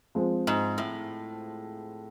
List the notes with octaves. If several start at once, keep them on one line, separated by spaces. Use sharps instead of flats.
F3 G#3 C4
G#2
A2